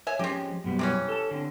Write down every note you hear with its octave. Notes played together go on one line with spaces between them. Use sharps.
C#5 E5 G#5
F3 G#3 C4 C#4 G4
F#2 B2 G3
C3 E3 C#4
A4 A5
D3 C4